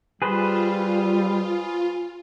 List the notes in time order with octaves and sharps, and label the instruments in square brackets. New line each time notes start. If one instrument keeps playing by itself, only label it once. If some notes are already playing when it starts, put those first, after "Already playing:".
[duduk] G3 [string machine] F4 [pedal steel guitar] G#4 B4 C5